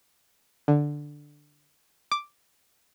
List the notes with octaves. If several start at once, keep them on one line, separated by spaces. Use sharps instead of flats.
D3
D6